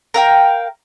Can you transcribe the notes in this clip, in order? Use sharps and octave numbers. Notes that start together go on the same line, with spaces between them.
A#4 F5 G5